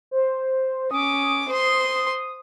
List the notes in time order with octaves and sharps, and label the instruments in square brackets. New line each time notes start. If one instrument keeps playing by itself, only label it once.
[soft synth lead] C5
[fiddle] C#4 D6 [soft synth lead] D#6
[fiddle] C5 C6 [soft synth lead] D#6